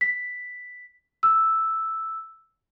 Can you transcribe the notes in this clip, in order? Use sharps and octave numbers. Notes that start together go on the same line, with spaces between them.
B6
E6